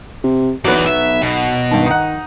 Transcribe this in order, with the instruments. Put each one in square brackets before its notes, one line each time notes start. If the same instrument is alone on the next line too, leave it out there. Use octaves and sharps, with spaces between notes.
[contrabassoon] C3
[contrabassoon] B1 [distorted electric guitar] E2 D5 [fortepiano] F#3 B3
[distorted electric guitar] E5
B2
[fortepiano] G2 A5 [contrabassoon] D#3
[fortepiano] D#4 F#5